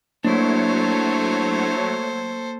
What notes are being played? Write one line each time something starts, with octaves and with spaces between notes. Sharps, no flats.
F#3 A3 A#3 D4 E4 A4 C5 C#5